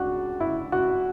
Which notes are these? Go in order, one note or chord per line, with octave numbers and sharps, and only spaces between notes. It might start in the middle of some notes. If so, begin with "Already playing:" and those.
Already playing: C#2 D4 F#4
E4
F#4